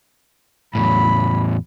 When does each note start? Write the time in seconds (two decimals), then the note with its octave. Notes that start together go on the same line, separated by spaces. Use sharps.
0.75 E2 A2 F#3 B5